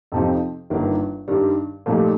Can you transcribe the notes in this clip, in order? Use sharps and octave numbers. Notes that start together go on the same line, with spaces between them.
F2 C3 F3 C4 D#4
G1 G2 D#3 A#3
G2 D#3 G3
A#2 F3 A3 D#4 G4